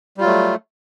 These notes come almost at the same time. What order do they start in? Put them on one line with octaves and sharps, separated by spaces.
G3 F4 F#3 A3